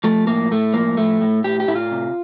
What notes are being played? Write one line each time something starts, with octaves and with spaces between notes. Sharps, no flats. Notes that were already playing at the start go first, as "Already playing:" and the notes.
F3 A3
A2 A#3
A2 A3
F3 A#3
A2 A3
A2
A2 G4
G4
A2 E4
F4
C3